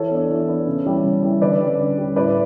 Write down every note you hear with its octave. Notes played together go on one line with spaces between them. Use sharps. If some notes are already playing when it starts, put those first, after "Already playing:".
Already playing: E3 A4 C#5
B3 D4
E3
B3 D4
C#3
E3 G3
C#3
E3 G3
D3 B4 D5
G3 C#4
D3
G3 C#4
A2 B4 D5